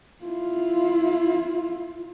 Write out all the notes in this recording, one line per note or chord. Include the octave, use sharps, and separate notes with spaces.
E4 F4